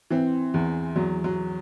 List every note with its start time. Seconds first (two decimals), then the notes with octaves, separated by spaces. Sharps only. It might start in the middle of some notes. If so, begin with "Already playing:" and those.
0.10 E3 C4
0.54 E2
0.96 E2 F#3
1.24 F#3